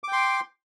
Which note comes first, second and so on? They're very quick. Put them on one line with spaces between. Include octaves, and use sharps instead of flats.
D6 G5 C6